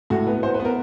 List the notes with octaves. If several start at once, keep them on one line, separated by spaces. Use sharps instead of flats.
A2 F#4
B3 B4
B3 C5
B4
B3
A#4